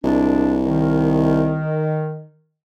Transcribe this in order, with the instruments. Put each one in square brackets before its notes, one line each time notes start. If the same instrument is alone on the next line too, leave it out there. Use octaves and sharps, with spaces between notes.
[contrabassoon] C2 [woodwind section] A#2 G#3 D4
[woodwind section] D#3